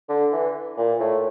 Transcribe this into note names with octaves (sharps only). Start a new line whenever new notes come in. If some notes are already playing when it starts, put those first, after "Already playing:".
D3
E3
A#2
A2